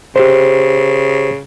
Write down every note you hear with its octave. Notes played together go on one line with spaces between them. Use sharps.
C#3 G4 C5